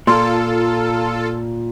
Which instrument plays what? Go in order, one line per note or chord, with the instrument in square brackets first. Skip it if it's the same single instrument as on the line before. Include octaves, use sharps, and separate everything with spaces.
[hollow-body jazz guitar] A#2 [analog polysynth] F4 A4 [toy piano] C6